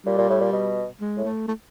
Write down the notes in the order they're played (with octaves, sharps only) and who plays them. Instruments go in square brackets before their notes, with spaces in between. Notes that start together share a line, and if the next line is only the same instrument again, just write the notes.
[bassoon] A#2 [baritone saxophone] G3
[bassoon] A#2
A2
A#2
B2
[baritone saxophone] G#3
[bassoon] A2
[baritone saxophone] A3
A3